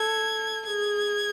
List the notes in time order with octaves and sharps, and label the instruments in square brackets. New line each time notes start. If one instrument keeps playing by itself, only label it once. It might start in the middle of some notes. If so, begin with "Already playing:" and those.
Already playing: [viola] A4 [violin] G#6
[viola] G#4 [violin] G#6